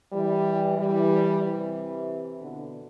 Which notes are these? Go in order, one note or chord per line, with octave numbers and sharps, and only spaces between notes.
E3 G3
E3 G3
C3 E3
B2 D3